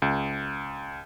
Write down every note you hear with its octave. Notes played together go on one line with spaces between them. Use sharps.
C#2